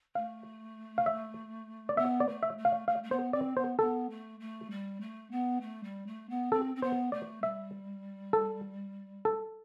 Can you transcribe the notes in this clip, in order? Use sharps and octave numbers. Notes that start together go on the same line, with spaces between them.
A3 F5
F5
E5
D5
B3 E5
D5
A3
E5
A3
F5
A3 F5
A3
B3 C5
C4 D5
B3 C5
B3 A4
A3
A3
G3
A3
B3
A3
G3
A3
B3
C4 A4
C4
B3 C5
A3 D5
G3 E5
A4
A4